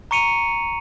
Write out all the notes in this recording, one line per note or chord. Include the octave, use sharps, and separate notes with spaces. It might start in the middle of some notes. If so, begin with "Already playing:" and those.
A#5 C#6 C#7 D#7 F7